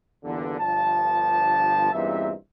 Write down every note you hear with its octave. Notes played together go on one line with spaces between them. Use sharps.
E2 G2 A#2 D3
G1 G2 F3 A5
E2 G2 A#2 C4 D#4 E5